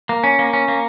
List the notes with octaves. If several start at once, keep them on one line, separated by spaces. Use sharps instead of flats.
A#3
C#4
A#3
C#4
A#3